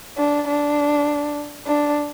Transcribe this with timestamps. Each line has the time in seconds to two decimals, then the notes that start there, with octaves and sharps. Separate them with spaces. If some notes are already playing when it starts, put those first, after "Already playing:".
0.18 D4
0.48 D4
1.67 D4